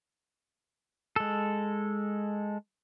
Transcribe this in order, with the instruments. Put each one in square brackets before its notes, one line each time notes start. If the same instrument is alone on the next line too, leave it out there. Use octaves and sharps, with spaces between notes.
[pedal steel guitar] G#3 A4